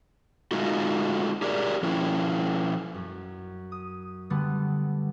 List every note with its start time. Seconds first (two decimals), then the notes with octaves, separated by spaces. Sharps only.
0.51 G#3 A3 D#4 F4 F#4
1.42 G4 G#4 A#4 D5
1.83 F3 C#4 E4
2.94 F#2
3.72 D#6
4.30 D3 G3 A3 B3